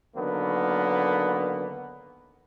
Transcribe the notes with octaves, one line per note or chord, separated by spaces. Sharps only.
D3 D#3 F#3 A#3 B3